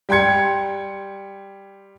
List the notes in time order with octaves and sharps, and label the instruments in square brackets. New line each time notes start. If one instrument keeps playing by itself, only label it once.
[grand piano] G3 G5 C6 G#6 C#7